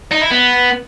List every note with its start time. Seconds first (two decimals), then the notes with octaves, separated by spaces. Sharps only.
0.11 D#4
0.21 E4
0.31 B3